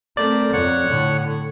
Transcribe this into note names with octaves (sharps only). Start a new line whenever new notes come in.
A3 C4 A#4 C5 D5
F2 C#5 F#5
A2 D3